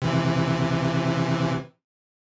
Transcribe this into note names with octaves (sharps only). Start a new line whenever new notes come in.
C3 E3